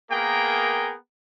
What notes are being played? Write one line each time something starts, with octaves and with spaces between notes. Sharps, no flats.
A#3 B3 G#4 A#4 G5